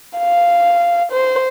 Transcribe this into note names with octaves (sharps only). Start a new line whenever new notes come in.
F5
C5